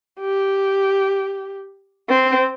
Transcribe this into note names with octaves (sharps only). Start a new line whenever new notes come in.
G4
C4